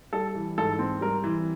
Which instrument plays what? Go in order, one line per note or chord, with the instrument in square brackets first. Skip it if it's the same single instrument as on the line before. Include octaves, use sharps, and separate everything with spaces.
[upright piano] G3 A4
E3
G#2 A4
C4
G3 A#4
E3